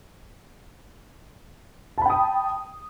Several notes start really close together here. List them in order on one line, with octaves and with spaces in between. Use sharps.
A5 B5 G5 D#6